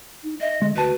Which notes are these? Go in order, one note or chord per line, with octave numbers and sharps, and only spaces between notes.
D#4
D#5 E5
D3 G#3
D2 F#4 B4 A5